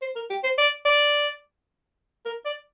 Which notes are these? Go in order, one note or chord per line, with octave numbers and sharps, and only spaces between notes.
C5
A#4
G4
C5
D5
D5
A#4
D5